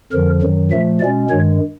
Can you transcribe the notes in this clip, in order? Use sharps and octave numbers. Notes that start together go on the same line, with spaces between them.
F2 D3 F3 A#4
F#2 D#3 F#3
A#2 F3 A3 E5
B2 G#3 C#4 D5
G2 D#3 G#3 C#5